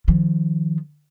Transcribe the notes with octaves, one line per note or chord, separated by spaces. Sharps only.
D#3 F3